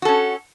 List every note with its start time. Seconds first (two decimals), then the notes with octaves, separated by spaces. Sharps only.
0.02 F#4
0.05 A4
0.08 C#4